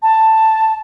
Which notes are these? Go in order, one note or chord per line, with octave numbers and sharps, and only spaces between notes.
A5